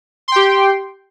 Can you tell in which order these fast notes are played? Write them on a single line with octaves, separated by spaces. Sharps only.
C6 G5 G4